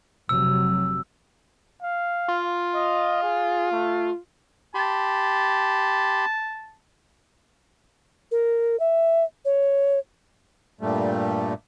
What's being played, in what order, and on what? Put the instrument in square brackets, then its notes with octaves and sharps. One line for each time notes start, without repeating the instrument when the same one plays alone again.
[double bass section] F1 C3 F#3 [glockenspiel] E6
[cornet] F5
[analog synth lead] F4
[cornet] D#5
G#4
A3
[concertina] G4 B5 C6 [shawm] A5
[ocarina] A#4
E5
C#5
[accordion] G2 A#2 G3 A3